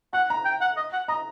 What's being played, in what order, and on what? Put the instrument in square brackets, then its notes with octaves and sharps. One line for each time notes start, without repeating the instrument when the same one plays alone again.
[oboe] F#5 [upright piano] F#6
[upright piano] A#5
[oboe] G5
F#5
D#5
F#5
[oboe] D#5 [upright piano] A#5